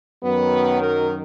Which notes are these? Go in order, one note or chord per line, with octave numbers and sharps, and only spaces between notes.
F#2 D#3 F#3 B3
A#4